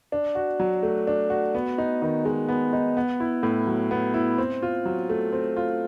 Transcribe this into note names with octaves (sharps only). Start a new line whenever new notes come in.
D4
F#4
F#3
A3
D4
F#4
B3
D#4
D#3
G#3
B3
D#4
B3
E4
A2
F#3
B3
E4
C4
F4
F#3
A3
C4
F4